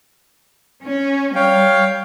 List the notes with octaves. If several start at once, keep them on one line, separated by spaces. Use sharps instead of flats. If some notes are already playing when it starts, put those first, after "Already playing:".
C#4
G3 C#5 F5 G5